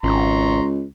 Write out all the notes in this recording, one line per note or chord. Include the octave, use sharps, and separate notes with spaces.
G#1 C#2 A#5 C6 C#6